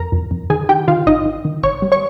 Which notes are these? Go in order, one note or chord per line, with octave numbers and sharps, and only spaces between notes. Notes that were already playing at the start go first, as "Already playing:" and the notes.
Already playing: F2 A#4 A#5
F2
F2
D#3 G#4 G#5
D#3 G4 G5
D#3 F4 F5
G#1 D#4 D#5
D#3
D#3
G#1 C#5 C#6
G3
C#5 C#6